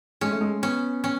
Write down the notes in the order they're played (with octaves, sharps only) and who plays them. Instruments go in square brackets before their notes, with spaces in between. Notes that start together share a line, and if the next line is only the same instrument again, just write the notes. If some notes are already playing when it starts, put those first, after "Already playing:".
[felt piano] G#3 [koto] C#4
[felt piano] A3
G#3
[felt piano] B3 [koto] C#4
[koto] C#4